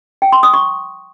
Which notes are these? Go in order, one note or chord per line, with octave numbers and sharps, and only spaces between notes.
G5
C6
D#6
C#6